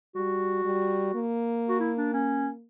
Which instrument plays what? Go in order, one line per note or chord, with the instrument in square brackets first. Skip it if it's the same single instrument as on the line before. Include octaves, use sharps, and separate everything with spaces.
[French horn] G3 [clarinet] F#4
[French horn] G3
A#3
[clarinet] F#4
E4
D4
C#4